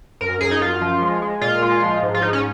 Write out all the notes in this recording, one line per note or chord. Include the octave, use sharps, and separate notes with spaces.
F#2 A#4
F#2 G#4
D#4
F#2 F4
F3
G#3
G#3
A#2 F4
G#3
F3
G#2
F4
G#2 D#4
C#4